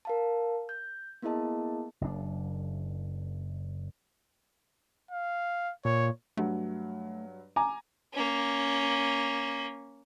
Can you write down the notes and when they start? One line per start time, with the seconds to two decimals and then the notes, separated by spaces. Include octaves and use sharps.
0.05 A#4 F5 A5
0.69 G6
1.22 A#3 B3 E4 G#4 D#5 A5
2.01 F#1 C#3 D4
5.11 F5
5.85 A#2 C#5
6.37 G2 F#3 A3
7.56 G#5 A#5 D6
8.13 A#3 C#4